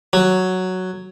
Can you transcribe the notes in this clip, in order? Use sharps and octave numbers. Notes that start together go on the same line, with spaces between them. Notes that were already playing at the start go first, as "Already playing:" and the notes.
F#3